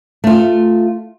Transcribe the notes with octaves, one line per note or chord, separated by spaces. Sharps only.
A3 F4